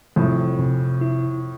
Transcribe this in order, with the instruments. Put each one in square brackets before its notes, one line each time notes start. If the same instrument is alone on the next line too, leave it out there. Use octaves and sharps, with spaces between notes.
[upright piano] F2 A2 [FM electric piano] C3
[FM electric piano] C3
E4